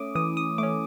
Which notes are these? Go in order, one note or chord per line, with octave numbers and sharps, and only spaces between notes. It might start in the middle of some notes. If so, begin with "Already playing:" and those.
Already playing: A3 C#4 D6 D#6
E3 D#6
D#6
A3 C#4 D6